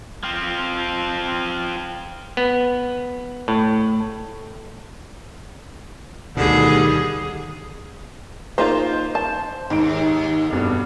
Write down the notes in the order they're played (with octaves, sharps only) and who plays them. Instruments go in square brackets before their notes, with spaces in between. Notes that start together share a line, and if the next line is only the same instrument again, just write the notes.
[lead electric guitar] F3 C4
[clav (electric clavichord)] B3
A2
[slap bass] D2 B2 [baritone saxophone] D3 [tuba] D#3 [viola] G3 G#4
[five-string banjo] A#3 D#4 F4 [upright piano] C5
[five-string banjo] A5
[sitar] D#2 [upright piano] G#2 D7
[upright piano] F1 G2 B2